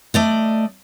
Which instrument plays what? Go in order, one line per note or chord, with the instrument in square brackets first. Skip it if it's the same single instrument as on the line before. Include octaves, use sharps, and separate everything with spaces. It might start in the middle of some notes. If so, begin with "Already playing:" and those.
[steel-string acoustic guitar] A3 D5 D#5